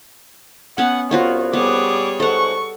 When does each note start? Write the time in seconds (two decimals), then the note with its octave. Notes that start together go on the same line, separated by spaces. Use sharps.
0.78 B3 C#4 F#5
1.11 C2 B3 F4 F#4 C#5
1.53 G3 B3 G#4 C#5 D6
2.20 G#2 A4 F#5 C#6